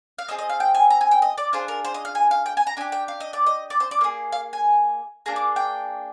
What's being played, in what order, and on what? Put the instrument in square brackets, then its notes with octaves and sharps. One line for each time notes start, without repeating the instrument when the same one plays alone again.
[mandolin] F5
C4 F4 G#4 D#5
D#5
F5
G5
G#5
A#5
G#5
G5
D#5
D5
D4 F4 G#4 C5
A#4
C5
D#5
F5
G#5
F5
G5
G#5
A#5
D4 G4 G#5
G5
F5
D#5
D5
D#5
D5
C5
D5
A#3 D#4 G#4
F5
G#5
A#3 D4 G#4 A#5
D6
G5